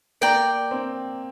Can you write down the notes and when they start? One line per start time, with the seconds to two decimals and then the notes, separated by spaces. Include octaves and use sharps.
0.21 A#3 D5 G5 A#5
0.71 C4